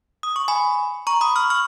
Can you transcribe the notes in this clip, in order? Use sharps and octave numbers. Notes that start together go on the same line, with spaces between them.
D#6
C#6
G#5 B5
A#5 C#6
B5 D#6
C#6 F6
C#6 F6